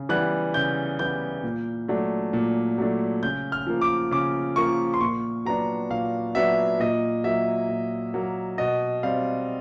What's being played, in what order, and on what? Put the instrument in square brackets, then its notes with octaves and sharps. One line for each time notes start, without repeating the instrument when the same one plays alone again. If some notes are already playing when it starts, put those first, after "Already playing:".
Already playing: [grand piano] C#3
E3 G3 B3 F#6
C#3 G6
E3 G3 B3 G6
A#2
F#3 A3 D4
A#2
F#3 A3 D4
C#3 G6
F6
F3 A#3
D6
C#3 D6
F3 A#3 C#6
C6
A#2 C#6
F#3 B3 D4 A#5
A#2 F5
F#3 B3 D4 E5
A#2 D#5
F#3 A#3 E5
A#2
F#3 A#3
B2 D#5
G3 C4 F5